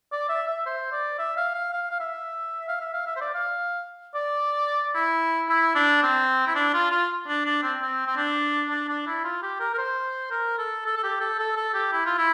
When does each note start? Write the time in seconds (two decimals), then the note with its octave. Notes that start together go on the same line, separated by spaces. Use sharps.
0.12 D5
0.29 E5
0.48 E5
0.66 C5
0.92 D5
1.19 E5
1.37 F5
1.54 F5
1.73 F5
1.91 F5
2.00 E5
2.69 F5
2.81 E5
2.93 F5
3.06 E5
3.16 C5
3.21 D5
3.34 F5
4.15 D5
4.95 E4
5.49 E4
5.75 D4
6.03 C4
6.47 E4
6.55 D4
6.73 F4
6.91 F4
7.27 D4
7.45 D4
7.63 C4
7.82 C4
8.06 C4
8.16 D4
8.70 D4
8.88 D4
9.07 E4
9.24 F4
9.43 G4
9.60 A#4
9.74 A#4
9.78 C5
10.31 A#4
10.58 A4
10.86 A4
10.97 A4
11.03 G4
11.21 A4
11.39 A4
11.56 A4
11.74 G4
11.92 E4
12.06 F4
12.18 E4